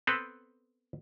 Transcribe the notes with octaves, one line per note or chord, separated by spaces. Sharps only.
B3 C4 A4 B4